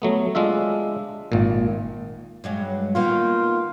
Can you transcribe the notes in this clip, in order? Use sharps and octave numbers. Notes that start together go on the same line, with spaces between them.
F#3 A3 B3
G#3 D4 F4 E5
G#1 A#2
G2 F#3 G#3
D#3 A#3 B3 F4